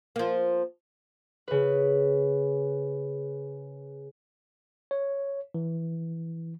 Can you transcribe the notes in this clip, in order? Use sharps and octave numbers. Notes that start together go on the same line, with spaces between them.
F3 A#3
C#3 B4
C#5
E3